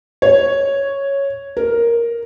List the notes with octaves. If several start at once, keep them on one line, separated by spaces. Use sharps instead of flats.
C#5
A#4